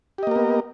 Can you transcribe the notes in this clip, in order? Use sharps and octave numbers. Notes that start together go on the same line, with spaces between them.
A#3 B3 G4 A#4 D#5